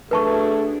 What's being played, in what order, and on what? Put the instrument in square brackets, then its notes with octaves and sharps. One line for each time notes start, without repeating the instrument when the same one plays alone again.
[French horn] A3 [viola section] D4 F#4 G#4 [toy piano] B4 A5 C#6